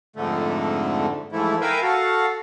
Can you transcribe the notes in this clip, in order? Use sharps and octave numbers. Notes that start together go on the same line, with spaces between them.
F2 G#2 D3 A3
G#2 E3 F3 A3 E4
A#4 B4 E5 F5 G5 G#5
F#4 A4 F5